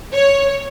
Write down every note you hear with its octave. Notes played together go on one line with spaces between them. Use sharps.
C#5